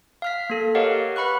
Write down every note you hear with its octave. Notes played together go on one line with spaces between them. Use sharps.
F5 F6 B6
A#3 A4
G4 A#4 C#5 D#5 F5 F#5
B4 F#5 B5 C#6 F#6